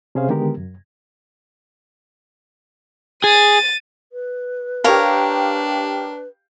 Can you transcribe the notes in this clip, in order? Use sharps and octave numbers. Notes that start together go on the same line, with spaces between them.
C3 C#4 G#4 C5 F5
D3 D#3 G#3 B3 G4 A#4
F#2
G#4 A6 D#7
B4
D4 G4 A#4 C#5 F5